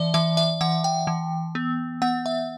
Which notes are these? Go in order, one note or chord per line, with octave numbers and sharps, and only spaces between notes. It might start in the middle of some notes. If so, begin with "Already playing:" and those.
Already playing: E3 D5 E5
E3 E5
E5
E3 F#5
G5
E3
B3
B3 F#5
E5